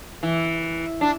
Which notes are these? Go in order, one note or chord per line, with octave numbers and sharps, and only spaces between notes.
E3
D4